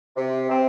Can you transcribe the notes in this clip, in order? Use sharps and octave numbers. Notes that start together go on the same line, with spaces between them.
C3
C4